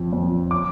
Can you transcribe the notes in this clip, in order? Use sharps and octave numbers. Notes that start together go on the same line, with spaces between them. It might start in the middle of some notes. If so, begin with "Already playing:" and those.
Already playing: F2 F3
F2
D6